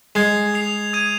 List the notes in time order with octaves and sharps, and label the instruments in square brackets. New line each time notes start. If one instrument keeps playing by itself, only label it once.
[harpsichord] G#3 [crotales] G#6 C7 F7
[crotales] D#6 C7 F7
D#6 G#6 D#7